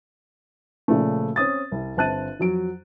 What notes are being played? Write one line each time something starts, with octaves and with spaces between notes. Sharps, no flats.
A#2 C#3 F3 A3
C4 C#4 D#6 A6
C2
G1 C4 A5 F#6 A6 D#7
F2 F#3 D7